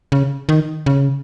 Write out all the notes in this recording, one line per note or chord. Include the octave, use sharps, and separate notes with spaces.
C#3
D#3
C#3